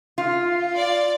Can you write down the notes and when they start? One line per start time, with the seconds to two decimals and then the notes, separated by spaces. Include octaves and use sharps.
0.18 F4
0.77 D5